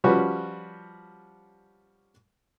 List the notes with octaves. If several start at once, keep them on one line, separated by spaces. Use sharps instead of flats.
F3 G3 C#4 F#4 B4